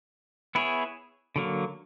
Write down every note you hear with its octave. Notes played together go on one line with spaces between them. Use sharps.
B3 E4 G#4 C#5
D3 F#3 A#3